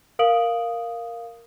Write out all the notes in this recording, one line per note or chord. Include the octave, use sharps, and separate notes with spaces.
A#4 F5 D#6 D7 F#7